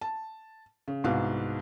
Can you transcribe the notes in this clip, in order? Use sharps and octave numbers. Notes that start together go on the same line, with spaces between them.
A5
C#3
C2 G#2 B3 F#4 F5